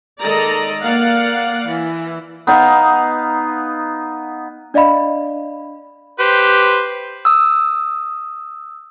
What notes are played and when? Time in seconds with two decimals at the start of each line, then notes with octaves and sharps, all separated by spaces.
0.21 D#3 G#3 A4 D5 D#5 A#5
0.83 A#3 D5 F5 F#5
1.68 E3
2.47 B3 D#4 F5
4.74 D4 D5 D#5 F5 B5
6.19 G4 B4 C5
7.25 D#6 E6